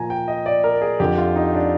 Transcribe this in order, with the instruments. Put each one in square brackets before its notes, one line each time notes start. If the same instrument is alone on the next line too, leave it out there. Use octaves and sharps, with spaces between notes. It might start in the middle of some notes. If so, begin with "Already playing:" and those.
Already playing: [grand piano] A#2 F3 G#5 A#5
G5
D#5
D5
A#4
G#4
F2 D3 F3 G4
F4
D#4
D4